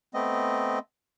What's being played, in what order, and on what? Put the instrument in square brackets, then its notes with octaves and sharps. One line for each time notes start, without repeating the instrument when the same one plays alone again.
[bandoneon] A3 B3 C4 D#5